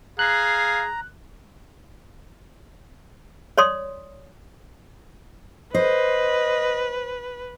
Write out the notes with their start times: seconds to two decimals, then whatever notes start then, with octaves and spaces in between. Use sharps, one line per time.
0.19 G#4 F5 A#5 F#6
3.58 C#5 D5 C6 D#6
5.74 B4 C5 D#5